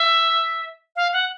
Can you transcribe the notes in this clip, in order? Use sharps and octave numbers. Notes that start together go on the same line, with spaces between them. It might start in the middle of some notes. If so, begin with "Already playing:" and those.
Already playing: E5
F5
F#5